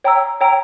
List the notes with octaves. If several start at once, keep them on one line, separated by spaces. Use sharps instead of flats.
C#5 G5 A#5 E6
C#5 G5 A#5 E6